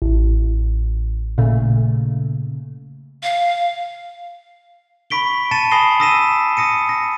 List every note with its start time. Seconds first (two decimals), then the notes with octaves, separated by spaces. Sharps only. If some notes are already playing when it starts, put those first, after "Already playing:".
0.02 A1
1.38 A#2 C#3 A3
3.23 F5
5.10 B5 C#6 B6 D7 G7
5.51 A5 A6 C#7 D#7 E7
5.71 G#5 B5 D#6 A#6 C7 G7
6.00 D#6 E6 A#6 B6 D#7 E7
6.57 D#6 A#6 C#7 D#7
6.89 A#6